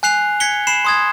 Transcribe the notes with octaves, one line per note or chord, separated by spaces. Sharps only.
G#5 F#6 C7 F7
G#6 B6 C#7 G7
B5 C7 E7
C6 D#6 G#6